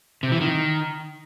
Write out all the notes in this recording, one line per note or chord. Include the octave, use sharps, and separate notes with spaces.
C3
E3
D#3